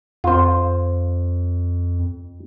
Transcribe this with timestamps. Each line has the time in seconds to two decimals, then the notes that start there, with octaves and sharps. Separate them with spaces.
0.24 F2 F4 C5